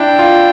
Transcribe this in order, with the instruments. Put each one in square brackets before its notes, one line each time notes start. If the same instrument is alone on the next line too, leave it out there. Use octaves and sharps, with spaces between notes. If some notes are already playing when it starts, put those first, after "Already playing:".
Already playing: [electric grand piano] D4 E4 [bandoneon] G5
[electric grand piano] F4